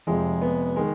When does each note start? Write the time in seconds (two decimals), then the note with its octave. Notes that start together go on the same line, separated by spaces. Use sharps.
0.07 F1 F2 C3 F3 G#3
0.42 B3
0.76 D#3 G#3